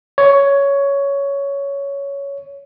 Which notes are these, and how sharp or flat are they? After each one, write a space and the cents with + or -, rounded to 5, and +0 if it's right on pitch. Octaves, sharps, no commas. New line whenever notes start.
C#5 +10